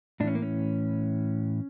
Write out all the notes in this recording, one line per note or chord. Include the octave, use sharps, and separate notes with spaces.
A2 E3 C#4 D4
A#3
C#4